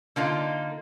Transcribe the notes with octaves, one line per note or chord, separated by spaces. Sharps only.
D3 A#3 D#4 F4